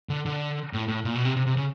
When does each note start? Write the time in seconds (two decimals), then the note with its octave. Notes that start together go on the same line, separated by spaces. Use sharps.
0.09 D3
0.26 D3
0.73 A2
0.88 A2
1.05 A#2
1.15 B2
1.25 C3
1.36 C3
1.47 C3
1.57 C#3